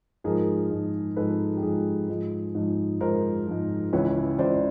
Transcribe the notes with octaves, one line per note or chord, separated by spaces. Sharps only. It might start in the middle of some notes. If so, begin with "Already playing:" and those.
G#2 F3 G#4 A#4
G#2 F3
G#2 F3 A4 B4
G4
G#2 F3 G#4
G#2 F3
G#2 F3
G#2 F3 A#4 C5
G#2 F3
C#2 C#3 E3 B4 C#5
C#2 C#3 E3 C5 D5